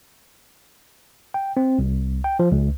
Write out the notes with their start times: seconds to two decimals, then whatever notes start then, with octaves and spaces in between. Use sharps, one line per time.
1.34 G5
1.57 C4
1.79 C2
2.24 G5
2.39 F3
2.52 C#2